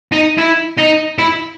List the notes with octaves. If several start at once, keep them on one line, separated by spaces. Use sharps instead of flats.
D#4
E4
D#4
E4